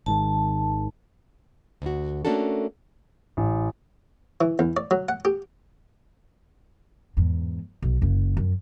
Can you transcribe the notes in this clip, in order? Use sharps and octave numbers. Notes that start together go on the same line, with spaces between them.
G#1 G#2 D#3 A5
D2 F#4
A3 A#3 C#4 D4 F#4 A4
A1
E3
E2
D5
F#3
F#5
G4
E2 G#2
B1
F#1 C#3
F#2